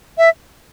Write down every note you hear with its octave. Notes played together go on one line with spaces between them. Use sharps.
E5